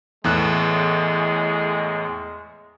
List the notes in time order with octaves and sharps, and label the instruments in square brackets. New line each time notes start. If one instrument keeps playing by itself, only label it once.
[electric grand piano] E2 A2 F#6 [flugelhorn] G#3